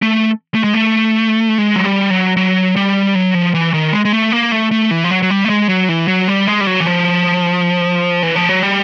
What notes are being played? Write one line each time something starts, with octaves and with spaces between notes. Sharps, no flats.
A3
A3
G#3
A3
G#3
F#3
G3
F#3
F#3
G3
F#3
F3
E3
D#3
G#3
G#3
A3
A#3
A3
A3
E3
F3
F#3
F#3
G3
A3
G#3
F#3
E3
F#3
G3
G#3
G3
F#3
E3
F3
E3
F3
F#3
G3